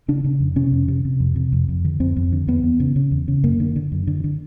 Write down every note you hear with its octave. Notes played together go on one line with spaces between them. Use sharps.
C#3 D4
C#3
F2
C3 C#4
F2
C3
C3
F2
C3
F2
F2
D3
F2 C4
F2
D3
E2 B3
E2
C#3
C#3
E2
C#3
F#2 A#3
D3
D3
F#2
D3
D3